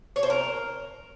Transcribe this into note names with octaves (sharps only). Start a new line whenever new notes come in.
C#5
C5
A#4